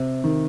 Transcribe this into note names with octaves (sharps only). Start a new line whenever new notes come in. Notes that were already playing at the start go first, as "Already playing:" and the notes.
Already playing: C3
D#3